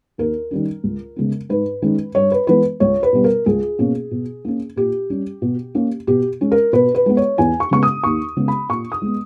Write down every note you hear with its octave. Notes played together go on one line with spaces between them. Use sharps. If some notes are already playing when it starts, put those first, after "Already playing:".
D#2 A#4
D#3 G3 C#4
C#2
C#3 G#3 B3
G#2 B4
D#3 G#3 C#4
G2 C#5
B4
E3 G#3 B3 B4
C#2 C#5
B4
B2 G3 B3
A#4
C#2 G#4
B2 A#3 C#4
B2
A#3 C#4
A#2 G4
G3 C#4
B2
A#3 C#4
B2 G4
G#3 C#4
A#4
B2 B4
B4
G#3 B3
C#5
E2 G#5
C#6
C#3 G#3 B3 C#6
D#6
D#2 C#6
C#3 G#3 B3
B5
A#2 C#6
D#6
G#3 B3